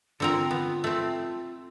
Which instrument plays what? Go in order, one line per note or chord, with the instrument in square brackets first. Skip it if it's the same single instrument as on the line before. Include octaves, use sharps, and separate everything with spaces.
[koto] D3 C4 A#4 [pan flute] F4
[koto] B3
A3 C4